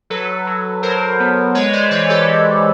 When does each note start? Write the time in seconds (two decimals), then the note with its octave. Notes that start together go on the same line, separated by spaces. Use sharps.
0.10 F#3 A4 B4
0.47 F#3
0.83 F#3 A#4 C5
1.20 B3
1.55 G#3 B4 C#5
1.73 C5 D5
1.91 E3 B4 C#5
2.09 G4 A4
2.27 E3